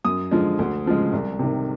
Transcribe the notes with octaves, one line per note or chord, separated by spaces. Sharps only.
F#2 D#6
D3 F3 G#3
D2
C#3 F3 G#3
C2
C3 D#3